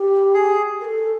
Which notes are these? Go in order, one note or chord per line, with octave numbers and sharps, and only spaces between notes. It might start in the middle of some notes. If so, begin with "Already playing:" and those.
Already playing: G4
G#4
A#4
A4